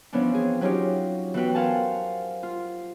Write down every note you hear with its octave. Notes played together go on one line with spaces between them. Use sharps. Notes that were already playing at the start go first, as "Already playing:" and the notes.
E3 F3 B3 C#4 D4
C4 G#4
F#3 C#4 D#4 F4 G4
E3 B3 F#4 B4 G5
A#4 C5 F5 F#5 G#5 A5
F4